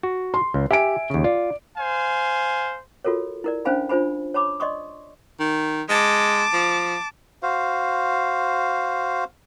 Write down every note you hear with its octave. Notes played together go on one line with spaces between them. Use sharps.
F#4
C6
C#2
G4 E5 G#5 D7
D#2 C#3
F4 D5
C5 F5 G#5
F4 F#4 A4 A#4 C#5
E4 A#4 D5
C#4 D4 C5 F5 G#5 B5
D4 F4 C5 G#5 B5
C#5 A5 B5 D6
D5 D#5 C6 C#6 D#6
D#3
G#3 A5 D6
F3
F#4 C5 F5